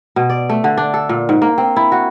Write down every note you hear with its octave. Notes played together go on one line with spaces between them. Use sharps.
B2
D5
A3
D3
D4
A4
A#2
G#2
A#3
C4
E4
F#4